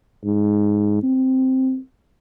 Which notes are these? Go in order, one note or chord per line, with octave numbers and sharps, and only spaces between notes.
G#2
C4